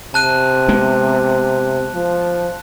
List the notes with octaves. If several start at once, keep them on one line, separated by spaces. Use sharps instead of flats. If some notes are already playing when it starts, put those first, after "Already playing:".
C3 A5 F#6 D#7
G#3 B3 C4
F3